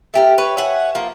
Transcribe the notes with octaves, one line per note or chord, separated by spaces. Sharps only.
A3 G4 A#4
B4 C#5
C#5 E5 F#5 G#5
F3 A#3